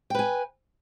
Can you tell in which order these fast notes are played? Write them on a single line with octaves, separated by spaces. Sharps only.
G5 B4 G#5